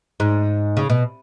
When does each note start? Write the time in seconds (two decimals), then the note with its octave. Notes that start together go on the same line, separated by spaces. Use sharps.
0.20 G#2
0.77 C#3
0.90 B2